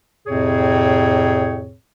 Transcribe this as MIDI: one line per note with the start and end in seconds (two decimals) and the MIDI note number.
0.27 1.73 41
0.27 1.73 45
0.27 1.73 48
0.27 1.73 60
0.27 1.73 68
0.27 1.73 73